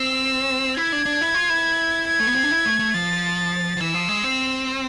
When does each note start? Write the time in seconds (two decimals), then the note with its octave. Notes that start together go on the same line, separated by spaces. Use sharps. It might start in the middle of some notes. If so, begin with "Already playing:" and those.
Already playing: C4 E6
0.77 E4 G#6
0.92 D4
1.06 D4
1.21 E4
1.34 F4
1.50 E4
2.07 G#6
2.20 A3
2.27 B3
2.35 C4
2.43 D4
2.51 E4
2.65 A3
2.79 A3
2.94 F3 A6
3.77 F3
3.80 E3 E6
3.94 F3
4.09 G#3
4.24 C4